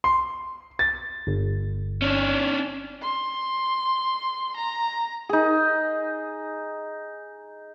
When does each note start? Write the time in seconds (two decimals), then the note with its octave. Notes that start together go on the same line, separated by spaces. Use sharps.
0.04 C6
0.79 A6
1.27 G1
2.02 C#4 D4
3.02 C6
4.57 A#5
5.29 D#4 G#4